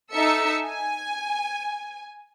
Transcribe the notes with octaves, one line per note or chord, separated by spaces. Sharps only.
D#4 A4 E5 E6 C#7
G#5